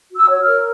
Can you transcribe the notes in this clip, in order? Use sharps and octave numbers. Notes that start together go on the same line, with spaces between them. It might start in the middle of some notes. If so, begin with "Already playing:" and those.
F#4
E6
C#5
F6
A#4